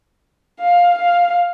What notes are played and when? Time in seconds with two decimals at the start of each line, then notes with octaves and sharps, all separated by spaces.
0.60 F5
0.99 F5